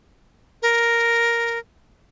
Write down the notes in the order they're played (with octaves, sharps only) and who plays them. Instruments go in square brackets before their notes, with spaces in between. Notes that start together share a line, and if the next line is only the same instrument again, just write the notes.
[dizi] A#4